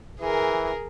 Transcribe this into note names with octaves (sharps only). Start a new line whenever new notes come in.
E3 G#4 A#4